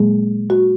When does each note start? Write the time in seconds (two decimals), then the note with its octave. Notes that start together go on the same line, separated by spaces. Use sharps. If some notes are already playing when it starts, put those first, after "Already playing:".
Already playing: A#2 F#3 G#3 A#3 G#4
0.50 F#4